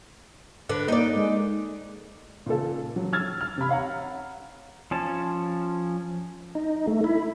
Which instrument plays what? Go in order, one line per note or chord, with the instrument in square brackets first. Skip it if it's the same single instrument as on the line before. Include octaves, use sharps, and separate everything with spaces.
[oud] D3 B4
[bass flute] A#3 [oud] D#4 D5
[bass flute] G#3
[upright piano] A#2 C#3 A4
F#3
E6 F6 G#6 A6
F6
C3 B5
C#5 F5 F#5 A#5
[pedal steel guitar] F3 C#4 A5
[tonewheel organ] D#4
A3
E4